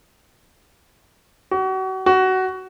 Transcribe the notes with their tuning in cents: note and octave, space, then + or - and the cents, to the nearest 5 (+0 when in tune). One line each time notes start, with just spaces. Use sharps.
F#4 +35
F#4 +20